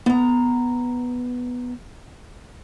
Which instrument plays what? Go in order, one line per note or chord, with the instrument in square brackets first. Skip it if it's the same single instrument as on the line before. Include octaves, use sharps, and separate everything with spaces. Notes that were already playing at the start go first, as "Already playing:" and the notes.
[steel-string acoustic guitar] B3 A#5